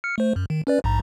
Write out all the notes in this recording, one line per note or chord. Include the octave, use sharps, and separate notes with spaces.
F6 C#7
A3 C5
F#2
D#3
C#4 B4 D5
A#1 G#2 A#5